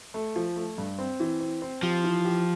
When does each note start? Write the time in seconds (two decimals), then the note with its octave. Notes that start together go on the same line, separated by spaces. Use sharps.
0.14 A3
0.36 F3
0.56 A3
0.78 G2
0.98 C4
1.20 E3
1.40 C4
1.62 C4
1.83 F3 G4
2.04 E3
2.25 G4